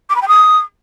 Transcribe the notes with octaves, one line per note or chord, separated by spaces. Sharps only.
D6
B5
G5
D#6